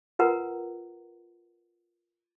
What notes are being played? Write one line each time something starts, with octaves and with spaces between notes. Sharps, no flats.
F4 A#4 B4 F#5 A#5